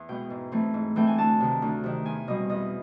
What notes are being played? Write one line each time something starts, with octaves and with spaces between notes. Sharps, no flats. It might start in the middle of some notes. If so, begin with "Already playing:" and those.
Already playing: E2
B2 G#3 B3 G5
G#2
E3 A3 C4
G#2
E3 A3 C4 G5
G#5
D2 A5
C3 D#3
D2
C3 D#3
E2 G#5
B2 G3 C4 D#5
E2 D#5